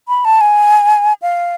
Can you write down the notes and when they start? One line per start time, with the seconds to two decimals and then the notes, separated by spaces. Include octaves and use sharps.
0.08 B5
0.25 A5
0.41 G#5
1.22 F5